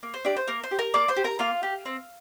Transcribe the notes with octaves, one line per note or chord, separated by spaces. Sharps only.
A#3
C5
D4 G4 D5
C5
A#3 A#4
C5
G4
A#4 A#5
A#3 D5 D6
C5 C6
G4
A#4 A#5
A#3 F4 F5
G4
C4